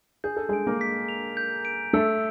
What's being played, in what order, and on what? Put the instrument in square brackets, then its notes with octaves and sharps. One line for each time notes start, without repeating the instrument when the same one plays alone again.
[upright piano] G#4 [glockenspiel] G6
[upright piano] A4
[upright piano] G#3 G#4 [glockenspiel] D7
[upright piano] A#3 A#4
[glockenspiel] B6
F7
G6
D7
[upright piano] A3 A4 [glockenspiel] E6